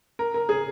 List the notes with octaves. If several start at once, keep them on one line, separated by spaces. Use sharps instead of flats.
A#4
A#4
G#4